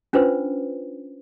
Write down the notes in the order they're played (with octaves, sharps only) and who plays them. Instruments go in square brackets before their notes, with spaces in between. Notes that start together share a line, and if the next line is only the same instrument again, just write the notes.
[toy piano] C#4 D4 F4 B4 C5